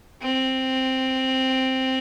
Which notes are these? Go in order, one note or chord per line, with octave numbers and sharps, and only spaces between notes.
C4